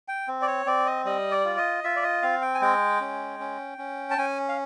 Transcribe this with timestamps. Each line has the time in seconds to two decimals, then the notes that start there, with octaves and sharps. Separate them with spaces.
0.08 G5
0.28 C4
0.42 D5
0.47 C#5
0.66 C4 D5
0.86 D#5
1.05 G3 D#5
1.31 D5
1.45 F4
1.58 D#5
1.84 F4 E5
1.96 D5
2.03 D#5
2.22 C4 F5
2.42 G5
2.55 G#5
2.61 G#3 G5
3.01 C#4
3.40 C#4
3.78 C#4
4.11 A5
4.18 C#4 G#5
4.49 F5